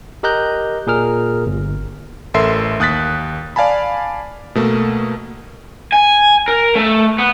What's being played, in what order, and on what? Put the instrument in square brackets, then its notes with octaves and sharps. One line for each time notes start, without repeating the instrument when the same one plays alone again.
[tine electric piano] G4 A#4 D#5 A#5 F#6 G6
A#2 G#4 A#4 F6
G1
[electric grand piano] A1 A4 A#4 E5 C6 C7
D#2 D#6 F#6 A6 B6
D5 F5 G#5 A5 B5
B2 A3 A#3
[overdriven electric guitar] G#5
A#4
A3
B3